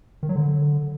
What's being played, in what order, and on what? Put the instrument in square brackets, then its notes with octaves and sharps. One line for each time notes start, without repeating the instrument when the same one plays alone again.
[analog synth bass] D#3
F#3
D3